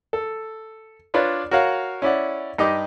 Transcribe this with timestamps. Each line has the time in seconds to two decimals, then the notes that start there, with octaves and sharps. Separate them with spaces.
0.13 A4
1.14 D4 F4 B4 C#5 D5
1.51 F#4 A#4 C#5 F5 F#5
2.02 C#4 E4 D5 F#5
2.58 G2 D#4 G4 D#5 D6 D#6